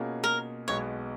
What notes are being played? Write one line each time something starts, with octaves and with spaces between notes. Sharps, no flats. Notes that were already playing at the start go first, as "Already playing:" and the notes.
Already playing: B2 A#3 C#4 F4 G#4
A#4
B1 B2 G#3 B3 C#5